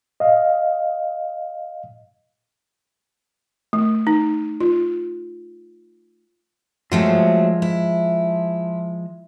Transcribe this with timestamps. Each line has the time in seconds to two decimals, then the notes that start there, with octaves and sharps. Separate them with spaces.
0.20 D#5 F5
3.73 A3
4.07 D#4
4.60 F4
6.92 F3 F#3 G#3 A3 C4
7.62 E4